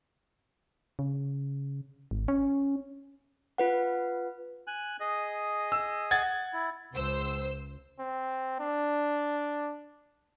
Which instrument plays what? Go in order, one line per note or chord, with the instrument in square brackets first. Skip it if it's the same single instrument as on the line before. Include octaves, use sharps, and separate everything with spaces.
[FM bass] C#3
G#1
C#4
[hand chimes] F4 B4 F#5
[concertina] G#5 F#6
G#4 D#5
[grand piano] E6
F#5 G#6 A6
[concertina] E4
[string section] C#2 C5 E6
[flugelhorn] C4
D4